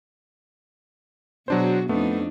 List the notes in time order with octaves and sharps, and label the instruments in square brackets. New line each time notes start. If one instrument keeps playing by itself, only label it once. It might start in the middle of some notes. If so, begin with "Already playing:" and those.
[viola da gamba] B2 F#4 G#4 [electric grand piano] F#3 D4 C5
[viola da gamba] F2 D4 D#4 [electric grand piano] A3 B3